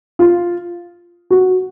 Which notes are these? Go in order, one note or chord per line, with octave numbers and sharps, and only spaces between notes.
F4
F#4